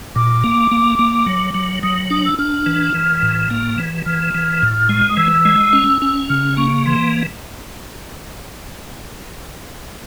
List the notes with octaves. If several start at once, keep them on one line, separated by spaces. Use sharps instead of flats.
A#2 D6
A#3
A#3
A#3
F#3
F#3
F#3 D#6
D4 D#6
E6
D4 F6
E3
E3
A2
A#3
E3
E3 F6
E3
A2
G#3
D#6
E3 E6
G#3
C#4
C#4
C#3 F6
A#3 C#6
E3 C6